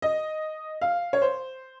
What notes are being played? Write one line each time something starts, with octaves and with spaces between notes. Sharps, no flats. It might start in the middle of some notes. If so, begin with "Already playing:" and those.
D#5
F5
C#5
C5